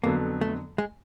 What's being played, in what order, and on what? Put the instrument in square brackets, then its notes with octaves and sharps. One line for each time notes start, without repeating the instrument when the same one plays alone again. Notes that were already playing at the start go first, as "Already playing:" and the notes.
[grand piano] F2 D3 F#3 B3 [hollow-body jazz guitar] A#3
[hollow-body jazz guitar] A3
G#3